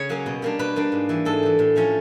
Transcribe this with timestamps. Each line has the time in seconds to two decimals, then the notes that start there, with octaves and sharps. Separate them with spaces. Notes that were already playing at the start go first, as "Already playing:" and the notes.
Already playing: C#3 C#5
0.09 F#3 A#3 C#4
0.26 B2
0.42 G3 A#3 D4
0.59 B2 B4
0.76 G3 A#3 D4
0.92 G#2
1.09 E3 G3
1.25 G#2 A4
1.43 E3 G3
1.59 A2
1.76 F3 A3 C#4 F4